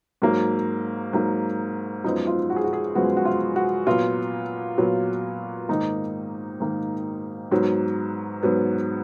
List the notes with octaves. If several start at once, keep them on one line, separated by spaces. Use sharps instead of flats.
G#2 F#3 A#3
G#2 F#3 A#3
F#2 F3 G#3 B3 D#4
F4
F#4
G#4
F#4
G#4
F#2 F3 G#3 B3 F#4
F#4
F4
F#4
A#2 F#3 B3 F4
A#2 F#3 B3
G#2 D#3 A#3 D#4
G#2 D#3 A#3
G#2 F#3 B3
G#2 F#3 B3